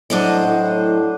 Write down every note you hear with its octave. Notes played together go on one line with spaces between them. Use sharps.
A2 F#3 D4 C5 D#5
A2 F#5